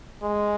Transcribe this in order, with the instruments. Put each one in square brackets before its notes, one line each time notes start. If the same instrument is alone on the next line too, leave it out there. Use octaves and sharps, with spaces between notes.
[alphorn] G#3